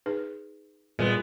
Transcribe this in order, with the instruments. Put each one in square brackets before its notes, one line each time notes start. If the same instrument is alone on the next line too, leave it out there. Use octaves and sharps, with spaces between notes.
[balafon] D#4 G#4 B4
[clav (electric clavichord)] A#2 [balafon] G3 [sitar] G#3 B3